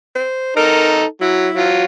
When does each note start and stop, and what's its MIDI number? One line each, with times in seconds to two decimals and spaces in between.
0.15 0.55 72
0.57 1.04 63
0.57 1.04 69
0.57 0.96 70
1.21 1.48 54
1.21 1.77 64
1.55 1.85 54
1.55 1.85 65